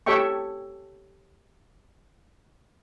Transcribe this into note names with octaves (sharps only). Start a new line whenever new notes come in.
G4 A4 C#5 E5 G5 C#6